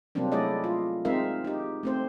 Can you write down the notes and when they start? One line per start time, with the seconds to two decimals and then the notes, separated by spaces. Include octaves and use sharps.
0.15 C3 F#3 G3 A#3 C4 D4
0.32 A3 E4 G#4 D5 D#5
0.64 F4
1.05 G#3 C4 D#4 A#4 E5 F5
1.45 D#4 G4
1.83 A3 C4 C5